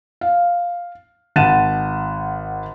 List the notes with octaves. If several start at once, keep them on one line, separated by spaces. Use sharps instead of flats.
F5
G#1 F#5 A5 A6 D#7 E7